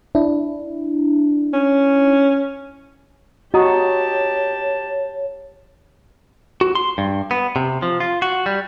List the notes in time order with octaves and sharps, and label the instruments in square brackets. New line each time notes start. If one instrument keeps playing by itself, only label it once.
[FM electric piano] D4 E4
[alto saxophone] C#4
[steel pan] F#4 [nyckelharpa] G4 A5 [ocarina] C#5 [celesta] D#5 A#5 D#6
[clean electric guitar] F#4
C6
G2
B3
C3
F3
F4
F#4
G3